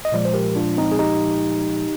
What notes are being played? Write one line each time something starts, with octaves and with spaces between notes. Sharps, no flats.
D#5
A#2 F3 G#3 D5
C5
G4 A#4
D4 F4
C4 D#4
G#4
D#4 G4